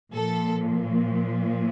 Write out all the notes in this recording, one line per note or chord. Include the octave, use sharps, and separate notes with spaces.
A#2 F3 A4